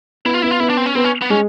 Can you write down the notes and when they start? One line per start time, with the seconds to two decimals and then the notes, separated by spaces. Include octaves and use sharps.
0.25 B3 E4
0.34 F4
0.42 B3 E4
0.51 F4
0.60 B3 E4
0.70 D4
0.77 C4
0.86 C#4
0.95 B3 C4
1.04 C#4
1.21 B3
1.30 G#3 C#4